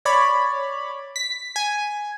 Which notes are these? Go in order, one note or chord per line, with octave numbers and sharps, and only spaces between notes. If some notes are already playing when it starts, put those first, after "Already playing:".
C#5 D5 B5
B6
G#5